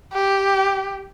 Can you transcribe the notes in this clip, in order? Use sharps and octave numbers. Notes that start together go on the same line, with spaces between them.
G4